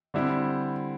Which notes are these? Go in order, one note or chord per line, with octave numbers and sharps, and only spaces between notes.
D3 G3 C4 E4